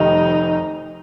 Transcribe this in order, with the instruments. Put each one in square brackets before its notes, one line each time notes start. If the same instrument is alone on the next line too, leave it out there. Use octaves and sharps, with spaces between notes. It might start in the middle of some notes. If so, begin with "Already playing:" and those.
Already playing: [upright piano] F1 F2 D#3 G3 [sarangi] D#4